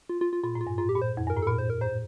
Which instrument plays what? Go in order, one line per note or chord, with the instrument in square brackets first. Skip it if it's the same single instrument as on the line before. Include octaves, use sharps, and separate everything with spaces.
[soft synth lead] F4
F4
F4
[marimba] A#2 [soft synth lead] F4
[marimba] A2
[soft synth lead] F4
[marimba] G2
[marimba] A2 [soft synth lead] F4
[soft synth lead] G4
[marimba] A#2
[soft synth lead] C5
[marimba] F2
[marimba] G2 [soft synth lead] A#4
[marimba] A2
[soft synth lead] A4
[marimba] A#2 [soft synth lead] A#4
[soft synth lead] C5
A#4
[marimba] A2 [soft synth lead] C5